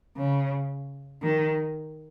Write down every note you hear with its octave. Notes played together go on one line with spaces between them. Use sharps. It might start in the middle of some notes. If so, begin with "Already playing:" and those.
C#3
D#3